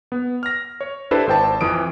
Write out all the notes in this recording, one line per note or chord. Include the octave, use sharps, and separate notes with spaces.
B3
F6 A#6
C#5
D4 E4 G4 A4 B4 C5
G#1 C5 G5 A5
F2 E3 D#6 D7